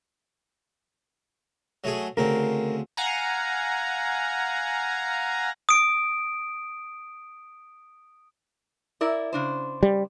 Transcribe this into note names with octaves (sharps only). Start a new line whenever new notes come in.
F#3 A3 G#4
D2 C#3 C4 A#4
F5 F#5 G#5 A#5
D#6 D7
E4 A#4 D5
C#3 D4 C5
G3